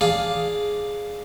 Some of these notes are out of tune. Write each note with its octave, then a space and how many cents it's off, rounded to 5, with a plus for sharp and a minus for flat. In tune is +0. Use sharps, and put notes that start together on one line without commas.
D4 +0 G#4 +0 F5 +0